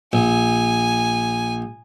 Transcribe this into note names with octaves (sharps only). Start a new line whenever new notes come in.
A#1 G#5